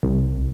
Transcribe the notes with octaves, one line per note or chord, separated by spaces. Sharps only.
C2